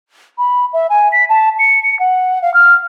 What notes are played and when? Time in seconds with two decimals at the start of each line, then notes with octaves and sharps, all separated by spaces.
0.38 B5
0.73 E5
0.90 G#5
1.12 B6
1.29 A5
1.59 C#7
1.83 C#7
1.99 F#5
2.42 F5
2.54 F6